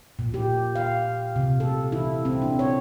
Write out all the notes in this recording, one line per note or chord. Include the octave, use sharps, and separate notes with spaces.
A#2
G4
F5
C3
A4
E4
C4
D4
C#5